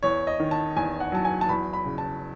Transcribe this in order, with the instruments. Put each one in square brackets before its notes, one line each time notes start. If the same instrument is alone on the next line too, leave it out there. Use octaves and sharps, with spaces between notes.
[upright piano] E2 C#5
D#5
D#3
A5
E2 G#5
F#5
F#3 A5
G#5
A5
E2 B5
B5
C#3
A5